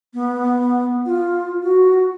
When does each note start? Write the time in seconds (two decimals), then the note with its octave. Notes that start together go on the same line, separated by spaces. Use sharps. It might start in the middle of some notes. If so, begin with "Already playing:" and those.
0.14 B3
1.06 F4
1.63 F#4